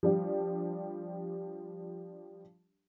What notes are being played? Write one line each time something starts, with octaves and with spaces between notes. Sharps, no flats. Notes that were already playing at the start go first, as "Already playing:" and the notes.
F3 G3 D4 G4